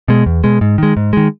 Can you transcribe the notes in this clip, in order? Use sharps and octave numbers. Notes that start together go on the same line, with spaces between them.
B2 G#3
E2
B2 G#3
G#2
D#3 G#3
G#2
D#3 G#3